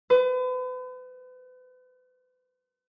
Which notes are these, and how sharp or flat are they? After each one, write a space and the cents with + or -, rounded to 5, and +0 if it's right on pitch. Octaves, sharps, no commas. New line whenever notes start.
B4 +40